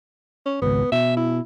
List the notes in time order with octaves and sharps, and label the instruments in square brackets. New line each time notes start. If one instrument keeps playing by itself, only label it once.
[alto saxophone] C#4
[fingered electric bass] G#1 C#2 [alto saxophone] B3
[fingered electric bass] B2 [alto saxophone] E5
[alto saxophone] E4